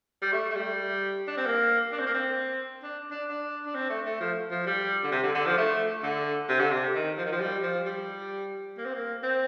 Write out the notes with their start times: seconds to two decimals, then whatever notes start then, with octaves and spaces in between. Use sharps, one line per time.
0.22 G3
0.32 A3
0.50 A3
0.55 G3
1.28 D4
1.37 C4
1.46 A#3
1.92 D4
1.99 C4
2.06 A#3
2.14 C4
2.83 D4
3.11 D4
3.29 D4
3.66 D4
3.75 C4
3.90 A3
4.05 A3
4.20 F3
4.51 F3
4.66 G3
5.04 D3
5.12 C3
5.23 D3
5.35 D3
5.46 F3
5.58 A3
6.03 D3
6.49 C3
6.59 D3
6.71 C3
6.94 D#3
7.18 F3
7.25 D#3
7.32 F3
7.40 G3
7.63 F3
7.86 G3
8.78 A#3
8.85 C4
8.94 A#3
9.23 C4